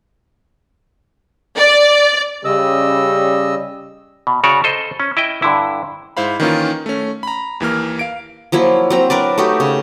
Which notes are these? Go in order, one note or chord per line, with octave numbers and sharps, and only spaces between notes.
D5
C#3 G3 C#4 G4 D#5 E6
B2
C#3 F#4 C#5 D5
A4 C5 D#5
C#4
E4 D#5 E5 G5
G2 D3 E4
G#2 E4 C5 F5 B5
D#3 E3 A#3 C#4 D#4 F4
A3 C#4
A#5 B5
D#2 E3 A#3 F6
F5 D7
F3 F#3 A#3 E4
F#3 C4 A#5
D4 A#4 B4 D5
A3 D#4 F#4 G4
C#3